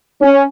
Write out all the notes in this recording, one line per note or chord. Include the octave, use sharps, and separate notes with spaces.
C#4